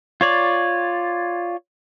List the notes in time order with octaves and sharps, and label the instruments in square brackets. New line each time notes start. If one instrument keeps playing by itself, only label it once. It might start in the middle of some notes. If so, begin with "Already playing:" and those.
[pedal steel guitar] F4 C#5 D5